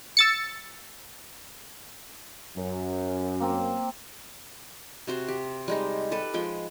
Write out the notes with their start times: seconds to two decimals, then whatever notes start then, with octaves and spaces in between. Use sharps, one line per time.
0.17 E6 A6 C#7
2.57 F#2
3.40 A#3 C4
5.07 C3 F#4 C5
5.28 G4
5.68 G3 G#3 D#4
6.11 G4 A4 B4
6.34 F3 G#3 G5